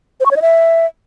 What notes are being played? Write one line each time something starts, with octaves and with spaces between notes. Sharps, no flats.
C5
C#6
C#5
D#5
E5